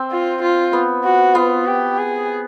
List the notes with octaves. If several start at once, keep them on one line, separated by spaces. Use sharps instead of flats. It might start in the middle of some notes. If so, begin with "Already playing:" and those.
Already playing: C4
F4
F4
B3
F#4
B3 F4
G4
G#4